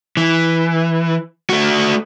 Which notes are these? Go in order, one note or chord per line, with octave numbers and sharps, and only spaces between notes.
E3
A3 F#4